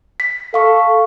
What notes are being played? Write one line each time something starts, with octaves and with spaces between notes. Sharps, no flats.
B6
A4 F5 C#6